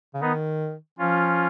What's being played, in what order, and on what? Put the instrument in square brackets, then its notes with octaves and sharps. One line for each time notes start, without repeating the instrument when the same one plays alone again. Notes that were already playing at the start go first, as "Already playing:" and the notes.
[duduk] C#3
[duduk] D#3 [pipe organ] B3 D#4
[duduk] F3 [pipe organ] C#4 F4